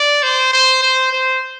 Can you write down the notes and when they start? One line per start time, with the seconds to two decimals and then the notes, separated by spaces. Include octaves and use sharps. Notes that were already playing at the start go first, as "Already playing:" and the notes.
Already playing: D5
0.23 C5
0.53 C5
0.82 C5
1.12 C5